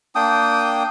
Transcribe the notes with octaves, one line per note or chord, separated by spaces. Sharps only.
A#3 D4 G5 D#6